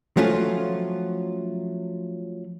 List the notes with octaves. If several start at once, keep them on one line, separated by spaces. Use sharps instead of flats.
F3 F#3 A3 C#4 F4